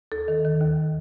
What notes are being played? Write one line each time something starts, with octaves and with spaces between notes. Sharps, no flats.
D#2 A4
D#3
D#3
D#2